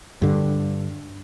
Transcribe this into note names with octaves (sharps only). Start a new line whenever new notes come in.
G2 D3